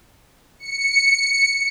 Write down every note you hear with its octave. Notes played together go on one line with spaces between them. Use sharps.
C#7